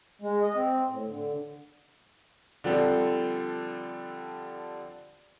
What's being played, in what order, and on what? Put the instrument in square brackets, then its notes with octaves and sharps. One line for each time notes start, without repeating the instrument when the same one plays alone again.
[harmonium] G#3
D#5
C4
A2
D3
[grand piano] D3 F3 G3 C4 A4